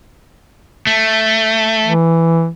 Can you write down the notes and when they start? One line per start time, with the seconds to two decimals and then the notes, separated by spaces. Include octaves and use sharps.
0.87 A3
1.83 E3